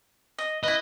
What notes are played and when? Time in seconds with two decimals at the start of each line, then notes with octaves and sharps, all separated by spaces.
0.38 D#5
0.63 E4 B4 D#5